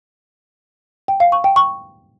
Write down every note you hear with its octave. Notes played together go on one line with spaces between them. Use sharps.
G5
F5
C#6
G5
C#6